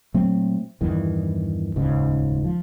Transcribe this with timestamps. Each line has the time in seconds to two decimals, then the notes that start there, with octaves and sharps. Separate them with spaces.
0.14 A#2 F#3 A3 C4
0.81 E2 G2 D#3 E3
1.76 D#1 C#2 G#2 C#3
2.44 F3